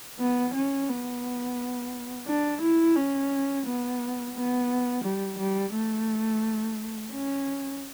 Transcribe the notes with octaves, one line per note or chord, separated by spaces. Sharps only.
B3
C#4
B3
D4
E4
C#4
B3
B3
G3
G3
A3
C#4